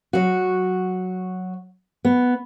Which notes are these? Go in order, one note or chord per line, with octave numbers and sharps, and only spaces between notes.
F#3 F#4
B3